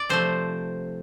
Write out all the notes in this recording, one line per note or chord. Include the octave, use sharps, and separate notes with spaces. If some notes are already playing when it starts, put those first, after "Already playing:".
Already playing: D5
C3 F3 A3 C5